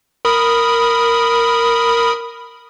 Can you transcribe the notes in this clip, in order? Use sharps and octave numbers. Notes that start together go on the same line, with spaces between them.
A#4 B5 D#6